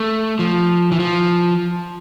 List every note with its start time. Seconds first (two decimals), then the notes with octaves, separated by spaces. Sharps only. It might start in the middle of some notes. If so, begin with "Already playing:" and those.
Already playing: A3
0.39 F3
0.92 E3
0.99 F3